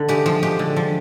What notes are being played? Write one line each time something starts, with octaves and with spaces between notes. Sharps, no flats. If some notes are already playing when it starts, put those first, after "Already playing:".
Already playing: D3
G#3 G4
F3
G#3 G4
D3
F3